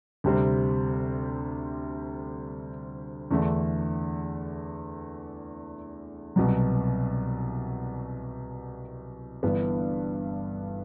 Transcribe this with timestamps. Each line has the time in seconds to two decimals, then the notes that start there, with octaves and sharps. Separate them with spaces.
0.24 D2 C3 G3 C4
3.31 E2 D3 A3 D4
6.36 C2 B2 F#3
9.43 G1 G2 E3 B3